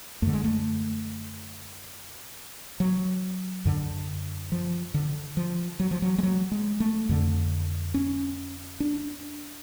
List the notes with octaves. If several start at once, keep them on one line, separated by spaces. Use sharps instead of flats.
F#2 D3 A3
G#3
A3
F#3
F#2 D3
F3
D3
F3
F#3
F3
F#3
G#3
F#3
G#3
A3
F2 D3
C#4
D4